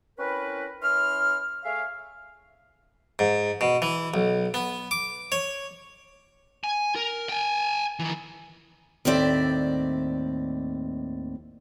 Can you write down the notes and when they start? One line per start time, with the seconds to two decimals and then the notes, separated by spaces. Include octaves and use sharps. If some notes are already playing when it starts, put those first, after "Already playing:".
0.18 C4 C#4 E4 A#4 B4
0.82 E3 C#4 B5 C6 F6
1.64 A3 G#4 C#5 E5 F5
3.19 G#2
3.61 B2
3.82 E3
4.14 B1
4.54 B3
4.91 D6
5.32 C#5
6.64 G#5
6.96 A#4
7.29 G5 G#5
7.99 D#3 E3
9.05 D#2 A2 C4 D5 E5